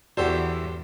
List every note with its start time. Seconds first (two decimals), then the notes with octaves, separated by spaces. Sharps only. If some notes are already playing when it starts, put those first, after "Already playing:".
0.17 E2 F#4 G4 A4 C5 D5